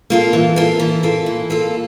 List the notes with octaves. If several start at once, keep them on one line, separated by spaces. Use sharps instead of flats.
A#3 F4 A4
E3
A#3 F4 A4
E3
A#3 F4 A4
E3
A#3 F4 A4